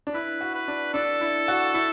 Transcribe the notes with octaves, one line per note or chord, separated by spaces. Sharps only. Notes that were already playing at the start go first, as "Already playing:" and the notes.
D4
E4 B4
F#4
B4
D4
D4 A4
E4
F#4
E4